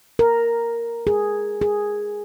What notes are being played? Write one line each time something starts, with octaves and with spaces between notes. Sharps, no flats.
A#4
G#4
G#4